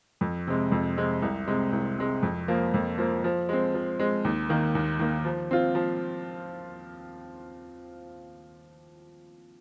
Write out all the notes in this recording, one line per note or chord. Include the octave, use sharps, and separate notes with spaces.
F2
C3 G#3
F2
C3 G#3
C2
C3 G#3
C2
C3 G#3
F2
F3 A#3
F2
F3 A#3
F3
G#3 C4
F3
G#3 C4
D#2
D#3 A#3
D#2
D#3 A#3
F3
C4 F4
F3